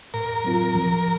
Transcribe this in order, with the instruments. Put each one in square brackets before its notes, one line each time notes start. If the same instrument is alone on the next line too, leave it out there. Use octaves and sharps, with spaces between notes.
[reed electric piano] A2 [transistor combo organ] A#4
[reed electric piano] F#3 C4 F4
F3